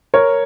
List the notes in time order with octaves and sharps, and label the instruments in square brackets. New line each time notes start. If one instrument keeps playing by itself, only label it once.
[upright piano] A#4 C#5